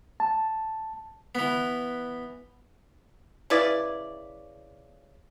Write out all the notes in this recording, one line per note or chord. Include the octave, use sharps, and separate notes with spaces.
A5
E3 B3
C#3 E4 B4 D5